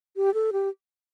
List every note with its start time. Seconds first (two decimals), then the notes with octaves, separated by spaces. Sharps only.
0.16 G4
0.34 A4
0.53 G4